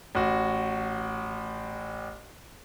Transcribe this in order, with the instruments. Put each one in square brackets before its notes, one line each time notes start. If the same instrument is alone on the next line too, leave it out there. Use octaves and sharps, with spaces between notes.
[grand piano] A1 F#4